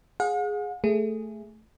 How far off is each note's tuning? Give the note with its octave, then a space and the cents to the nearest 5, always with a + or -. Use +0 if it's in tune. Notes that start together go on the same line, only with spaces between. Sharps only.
G#4 +0 F#5 -45
A3 +0 G#4 +0